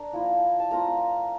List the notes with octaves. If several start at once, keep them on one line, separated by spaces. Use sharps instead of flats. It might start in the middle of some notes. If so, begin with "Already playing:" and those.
Already playing: D4 A#4 A#5
F3 A#3 E4
A5
A3 C4 F4 A#4 A#5